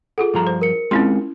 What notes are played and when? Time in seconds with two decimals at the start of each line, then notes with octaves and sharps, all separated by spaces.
0.18 F4 G#4 A4 F#5
0.34 G2 F3 A#5
0.47 C5
0.61 A#4 C#7
0.91 G#3 C4 C#4 E4 F4 C6